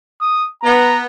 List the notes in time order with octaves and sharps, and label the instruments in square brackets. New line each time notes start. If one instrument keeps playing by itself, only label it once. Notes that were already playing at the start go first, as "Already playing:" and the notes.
[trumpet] D#6
[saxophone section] B3 [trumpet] A#5